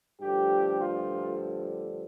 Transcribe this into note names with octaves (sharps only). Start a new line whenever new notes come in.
G2 D3 F3 A3 G4
F4